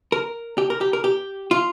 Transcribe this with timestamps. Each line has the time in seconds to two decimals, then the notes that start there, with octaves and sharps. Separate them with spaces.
0.12 A#4
0.58 G4
0.70 A#4
0.81 G4
0.93 A#4
1.04 G4
1.51 F4